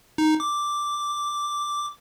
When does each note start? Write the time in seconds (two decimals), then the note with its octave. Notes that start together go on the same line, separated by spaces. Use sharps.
0.18 D#4
0.40 D6